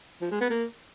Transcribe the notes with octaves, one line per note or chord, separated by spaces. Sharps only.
F3
G#3
B3
A#3